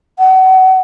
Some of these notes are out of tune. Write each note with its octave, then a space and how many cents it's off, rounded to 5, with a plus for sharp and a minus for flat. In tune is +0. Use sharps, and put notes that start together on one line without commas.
F#5 +30